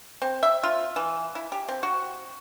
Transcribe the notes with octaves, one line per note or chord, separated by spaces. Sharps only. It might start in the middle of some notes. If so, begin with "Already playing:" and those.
C4
E5
F4
E3
E4
G4
C4
F#4